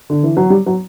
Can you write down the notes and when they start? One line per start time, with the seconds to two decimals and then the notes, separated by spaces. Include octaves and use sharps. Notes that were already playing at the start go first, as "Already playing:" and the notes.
0.10 D3
0.23 E3
0.37 F#3
0.50 G3
0.66 F#3